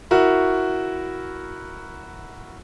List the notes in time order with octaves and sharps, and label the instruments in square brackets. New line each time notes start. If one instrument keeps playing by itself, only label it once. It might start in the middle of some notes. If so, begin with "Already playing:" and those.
[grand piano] E4 F#4 A#4